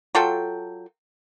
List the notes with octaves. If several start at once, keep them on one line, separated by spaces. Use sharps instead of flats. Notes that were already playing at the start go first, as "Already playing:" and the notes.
F#3 F4 A4 G5